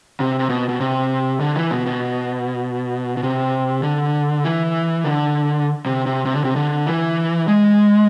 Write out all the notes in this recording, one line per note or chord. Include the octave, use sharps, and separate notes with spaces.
C3
C3
B2
B2
C3
D3
E3
B2
B2
B2
C3
D3
E3
D3
C3
C3
C3
D3
C3
D3
E3
G#3